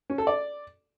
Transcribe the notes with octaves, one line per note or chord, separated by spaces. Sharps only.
C#4
A4
D5